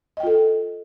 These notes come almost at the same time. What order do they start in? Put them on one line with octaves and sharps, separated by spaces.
D#5 G5 F4 A4